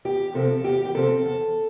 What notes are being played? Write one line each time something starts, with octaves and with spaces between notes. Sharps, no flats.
E2 G4
C3 F3 C4 A4
E2 G4
G4
C3 F3 C4 A4
E2